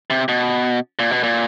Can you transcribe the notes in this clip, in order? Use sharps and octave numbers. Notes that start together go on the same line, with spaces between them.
C3
B2
A#2
B2
A#2